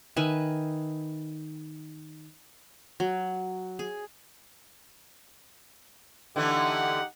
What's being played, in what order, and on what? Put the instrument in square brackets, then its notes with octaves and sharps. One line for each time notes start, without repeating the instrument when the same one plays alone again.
[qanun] D#3 B4 E5 G#5
F#3
G#4
[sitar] D3 E3 A3 [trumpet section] D#4 G4 F#5